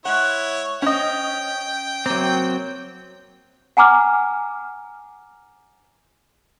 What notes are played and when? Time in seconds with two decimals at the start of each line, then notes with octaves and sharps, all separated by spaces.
0.05 G#3 E4 C#5 F#5
0.82 C#4 C5 D#5 G5
2.06 C3 F#3 A#3 C4
3.77 F#5 G#5 A#5 D6 F6